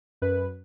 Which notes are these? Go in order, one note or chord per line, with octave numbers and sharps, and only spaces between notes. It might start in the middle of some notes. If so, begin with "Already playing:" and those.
F#2 B4